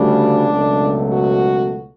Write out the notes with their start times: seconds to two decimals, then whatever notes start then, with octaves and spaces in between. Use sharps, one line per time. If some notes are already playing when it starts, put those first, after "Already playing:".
Already playing: D2 C#3 G3 D4
0.49 C#2 B2 F#3 A3
1.13 F#4